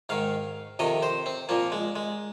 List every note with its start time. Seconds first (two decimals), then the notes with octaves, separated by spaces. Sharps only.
0.09 G#2 D#3 F5
0.79 F2 C3 D#3 D#5
1.03 C5
1.26 C4
1.49 A#2 F3 A#3
1.72 G#3
1.96 G#3